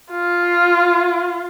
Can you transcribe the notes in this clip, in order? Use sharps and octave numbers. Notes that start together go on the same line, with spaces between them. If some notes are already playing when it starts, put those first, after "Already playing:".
F4